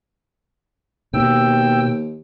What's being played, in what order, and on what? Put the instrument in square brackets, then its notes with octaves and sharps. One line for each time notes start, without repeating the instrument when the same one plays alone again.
[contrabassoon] D#2 [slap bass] B2 [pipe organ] G5 E6